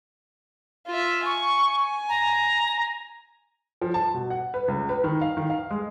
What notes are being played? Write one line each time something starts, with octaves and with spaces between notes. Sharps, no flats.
F4 E5
G#5 C#6
A#5
F3
A5
B2
F#5
B4
C#2
B4
D#3
F5
D#3
F5
G#3